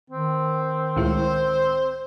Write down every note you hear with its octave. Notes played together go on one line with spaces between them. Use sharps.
D#3 C4
C#2 A2 C5